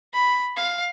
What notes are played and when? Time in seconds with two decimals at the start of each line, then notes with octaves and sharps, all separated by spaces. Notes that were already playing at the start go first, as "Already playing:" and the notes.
0.14 B5
0.57 F5